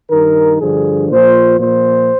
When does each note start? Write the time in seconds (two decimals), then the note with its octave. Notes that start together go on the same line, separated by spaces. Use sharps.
0.10 G2 D#3 A#4
0.60 G2 D3 F3 G#4
1.10 A#2 F3 C5
1.60 A#2 F3 C5